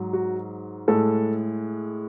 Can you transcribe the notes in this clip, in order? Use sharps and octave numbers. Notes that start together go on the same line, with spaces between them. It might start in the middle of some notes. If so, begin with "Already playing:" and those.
Already playing: G#2 F#3
F#4
A2 G#3 A4